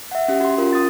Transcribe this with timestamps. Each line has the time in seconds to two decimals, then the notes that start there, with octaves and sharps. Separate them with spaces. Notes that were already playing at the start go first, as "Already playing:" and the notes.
0.11 E5 F#5
0.28 C#4 G4
0.40 F#4 C6
0.58 C#4 F4 A#4
0.73 D#6 A6